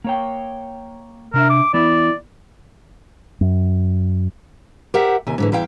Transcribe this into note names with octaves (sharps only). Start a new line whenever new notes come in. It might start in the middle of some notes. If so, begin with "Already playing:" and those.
A#3 C#5 G5
C3 D4 A#4 E5
D6
E3 B3 E4 D5
F#2
G4 A#4 C5 E5 F#5
D#2 C3 G#5
G#2 D3 E3
E2 E4 F5 G5